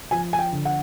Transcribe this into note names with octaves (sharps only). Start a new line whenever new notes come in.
F3 G#5
G#5
G5
D3
F#5